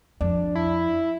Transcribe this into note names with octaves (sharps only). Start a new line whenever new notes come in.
F2 D4
E4